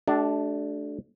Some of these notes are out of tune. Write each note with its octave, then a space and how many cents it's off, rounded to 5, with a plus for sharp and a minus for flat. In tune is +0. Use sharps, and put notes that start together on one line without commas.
A3 -30 D4 +0 F#4 +35